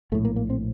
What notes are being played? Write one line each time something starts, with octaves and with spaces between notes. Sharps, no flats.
A#1 A2 A3
A#3
A#3
C4